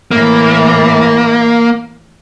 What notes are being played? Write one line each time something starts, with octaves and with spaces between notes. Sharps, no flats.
A2 E3 A#3